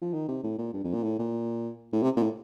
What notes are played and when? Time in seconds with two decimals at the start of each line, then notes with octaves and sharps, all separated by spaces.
0.01 F3
0.13 D#3
0.28 C3
0.43 A2
0.58 A#2
0.73 G2
0.84 F2
0.93 A#2
1.03 A2
1.19 A#2
1.92 A2
2.02 C3
2.17 A#2
2.23 A2